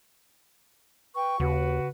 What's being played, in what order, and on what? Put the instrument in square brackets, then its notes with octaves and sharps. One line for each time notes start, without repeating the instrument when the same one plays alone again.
[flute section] B4 G5 C#6
[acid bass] D#2 [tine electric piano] C#3 [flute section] F#4 B4